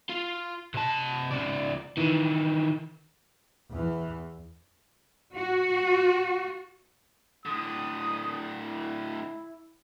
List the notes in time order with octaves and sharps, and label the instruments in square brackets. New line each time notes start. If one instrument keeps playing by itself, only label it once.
[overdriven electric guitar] F4
C3 A5
C#2 D5
D#3 E3
[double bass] E2 E3
[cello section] F#4
[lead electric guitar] A2 D3 [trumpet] D#6
[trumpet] E4